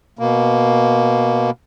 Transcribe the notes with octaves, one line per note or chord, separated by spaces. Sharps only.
B2 A#3